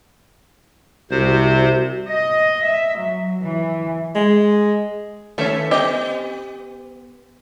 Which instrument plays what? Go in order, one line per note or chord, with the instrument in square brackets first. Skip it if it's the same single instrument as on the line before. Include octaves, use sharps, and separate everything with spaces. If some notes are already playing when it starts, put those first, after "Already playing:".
[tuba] C2 [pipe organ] C3 C5 [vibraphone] F#4
[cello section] D#5
E5
F#3
E3
[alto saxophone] G#3
[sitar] D#3 A4 E5 [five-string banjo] A3 C#4
[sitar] B3 [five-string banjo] G4 D#5